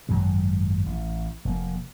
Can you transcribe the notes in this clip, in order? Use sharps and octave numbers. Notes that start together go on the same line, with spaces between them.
G#1 F#2 F#3 G#3
A1
F1 A#3